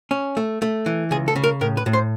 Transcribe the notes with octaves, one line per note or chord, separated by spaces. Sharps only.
C#4
A3
A3
E3
C#2 G#4
A4
C#3
A#4
A2 A#4
B4
A2
C5